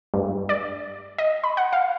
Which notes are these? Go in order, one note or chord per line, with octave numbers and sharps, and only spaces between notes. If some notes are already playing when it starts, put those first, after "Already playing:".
G2
D5
D#5
B5
F#5
F5